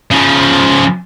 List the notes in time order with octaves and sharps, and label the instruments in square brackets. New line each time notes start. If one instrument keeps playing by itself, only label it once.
[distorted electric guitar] C#3 F3